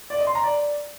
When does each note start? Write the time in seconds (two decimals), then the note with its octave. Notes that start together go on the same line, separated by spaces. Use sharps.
0.10 D5
0.18 D#5
0.27 C6
0.35 A#5
0.43 D5